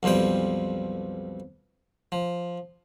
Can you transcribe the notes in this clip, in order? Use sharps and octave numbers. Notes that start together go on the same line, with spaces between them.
B1 F2 F3 G3 G5
F3